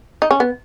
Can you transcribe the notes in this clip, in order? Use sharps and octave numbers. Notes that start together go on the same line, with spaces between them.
D#4
C#4
B3